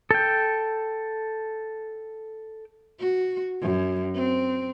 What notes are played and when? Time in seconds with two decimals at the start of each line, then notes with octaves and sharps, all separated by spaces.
0.11 A4 G5
3.00 F#4
3.62 F#2
4.15 C4